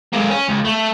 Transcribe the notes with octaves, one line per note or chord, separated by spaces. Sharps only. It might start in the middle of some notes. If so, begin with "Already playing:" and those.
G#3 A#3
C#4
C#2
A3